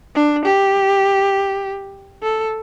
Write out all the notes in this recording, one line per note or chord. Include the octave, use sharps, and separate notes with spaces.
D4
G4
A4